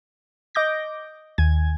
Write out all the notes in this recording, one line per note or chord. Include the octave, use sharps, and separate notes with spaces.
D#5 D6 G6 A#6
D#2 G#5 G#6